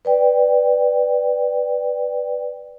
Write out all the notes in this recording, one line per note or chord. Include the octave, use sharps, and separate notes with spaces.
B4 D5 G5